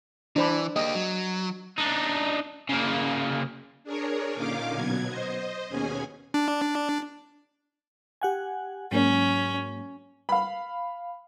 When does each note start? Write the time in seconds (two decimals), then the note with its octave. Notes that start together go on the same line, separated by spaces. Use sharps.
0.36 E3 D4 C5 B5
0.76 A#3 G4 D#5
0.95 F#3
1.78 D4 D#4
2.69 C#3 A#3
3.84 D4 G#4 A#4 C#5
4.34 A#2 D3 C#4 D#4 F5 D6
4.73 B2 F#3 B3 G#6
5.07 C5 D#5
5.69 D#2 B2 C#4 G#4 G#5
6.34 D4
8.21 G4 F#5 G#5
8.92 G#2 F#3 A#3 C#4
10.29 F5 B5